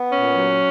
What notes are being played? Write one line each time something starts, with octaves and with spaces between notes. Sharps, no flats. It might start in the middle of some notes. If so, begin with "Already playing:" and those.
Already playing: B3
A#2 C#4
F#3